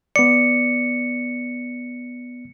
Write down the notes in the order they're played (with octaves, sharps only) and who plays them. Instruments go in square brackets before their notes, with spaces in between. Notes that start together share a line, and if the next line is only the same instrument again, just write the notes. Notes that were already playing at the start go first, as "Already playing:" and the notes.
[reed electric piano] B3 D5 [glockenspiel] C#7